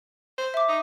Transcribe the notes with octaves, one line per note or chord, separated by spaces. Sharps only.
C5
E5 D6
D#4